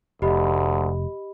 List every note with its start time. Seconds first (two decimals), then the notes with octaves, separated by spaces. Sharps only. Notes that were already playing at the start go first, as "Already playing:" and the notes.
0.22 F1 D2 G4 D#5 B5